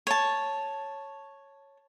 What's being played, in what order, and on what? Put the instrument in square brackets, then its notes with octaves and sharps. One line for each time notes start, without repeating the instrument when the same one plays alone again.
[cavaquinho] C#5 A5